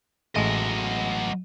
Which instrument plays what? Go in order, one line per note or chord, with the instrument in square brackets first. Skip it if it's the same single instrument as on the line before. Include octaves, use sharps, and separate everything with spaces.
[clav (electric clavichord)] A1 G#3 A3 [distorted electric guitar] F#3 D#5